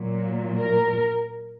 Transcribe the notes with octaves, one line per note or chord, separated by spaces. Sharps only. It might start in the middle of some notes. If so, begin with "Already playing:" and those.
Already playing: A#2 F#3
A#4